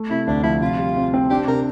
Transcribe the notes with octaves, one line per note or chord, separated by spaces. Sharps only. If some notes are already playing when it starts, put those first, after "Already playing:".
Already playing: A3
C3 E4
D2 D4
F3 E4
C3 F4
G3
C3
C4
D4 G4
C3 A#4